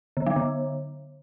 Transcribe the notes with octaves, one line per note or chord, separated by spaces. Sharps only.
D3
F#3
D3